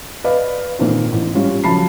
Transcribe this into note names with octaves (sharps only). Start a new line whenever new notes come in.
B4 D5 D#5 F5
A#2 D#3 A#3 C4
A1
G3 C#4 F4
C#3 F3 F#3 A5 B5 C7